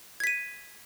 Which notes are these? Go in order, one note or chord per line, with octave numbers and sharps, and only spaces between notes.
G#6 B6 D#7